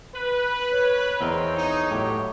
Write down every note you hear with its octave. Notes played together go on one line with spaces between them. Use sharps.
B4
C#5
E2 C4 A#4 D#5
D#4
A2 F#3 G4